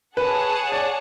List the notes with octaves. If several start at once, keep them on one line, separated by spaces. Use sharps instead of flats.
G#4 B4 C#5 F#5 A5
D5